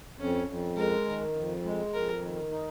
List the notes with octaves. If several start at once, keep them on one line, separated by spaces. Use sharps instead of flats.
F2 C#4
F2
G#3 A#4
D#3
F2
G#3
F2 A#4
D#3
D#4